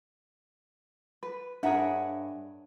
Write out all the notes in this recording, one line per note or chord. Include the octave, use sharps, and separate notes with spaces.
B4
G2 D4 G#4 A#4 C#5 E5 F#5